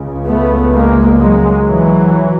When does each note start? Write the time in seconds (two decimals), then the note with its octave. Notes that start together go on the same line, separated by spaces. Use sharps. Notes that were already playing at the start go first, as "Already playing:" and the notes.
Already playing: C#2 C#3
0.26 A3 B3
0.72 G#3 A#3
1.19 F#3 G#3
1.66 E3 F#3